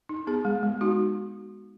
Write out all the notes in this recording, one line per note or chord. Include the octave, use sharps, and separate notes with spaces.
D#4
B3 G#4
G#3
G#3
D#4 F#4